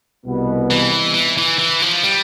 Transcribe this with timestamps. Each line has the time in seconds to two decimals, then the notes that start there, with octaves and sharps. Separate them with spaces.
0.25 C2 B2 B3
0.70 E3
1.14 E3
1.38 E3
1.59 E3
1.82 F3
2.04 G3